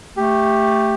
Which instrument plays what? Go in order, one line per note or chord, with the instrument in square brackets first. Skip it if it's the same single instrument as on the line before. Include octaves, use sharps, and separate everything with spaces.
[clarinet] A3 [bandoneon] G4